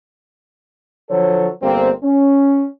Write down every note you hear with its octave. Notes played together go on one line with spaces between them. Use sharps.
D3 F3 F#3 A4 C5 C#5
G1 A#3 C4
C#4